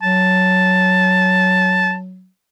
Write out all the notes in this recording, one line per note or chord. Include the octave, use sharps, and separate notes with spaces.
F#3 A5